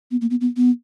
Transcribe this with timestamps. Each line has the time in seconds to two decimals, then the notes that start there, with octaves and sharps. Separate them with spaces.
0.11 B3
0.21 A#3
0.30 B3
0.41 B3
0.57 B3